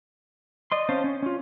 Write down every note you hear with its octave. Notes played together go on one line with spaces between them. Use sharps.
D5 D#5 C6
C4 C#4 C5 F5 A5
C#4
C#4 F4